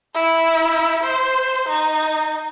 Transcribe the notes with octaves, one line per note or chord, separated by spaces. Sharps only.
E4
C5
D#4